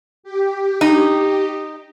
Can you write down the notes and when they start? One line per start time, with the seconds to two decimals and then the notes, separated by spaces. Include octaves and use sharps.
0.23 G4
0.81 D#4